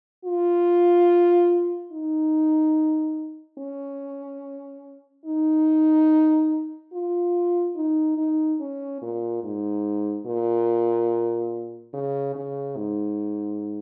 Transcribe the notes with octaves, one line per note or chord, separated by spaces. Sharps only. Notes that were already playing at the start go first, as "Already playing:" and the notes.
F4
D#4
C#4
D#4
F4
D#4
D#4
C#4
A#2
G#2
A#2
C#3
C#3
G#2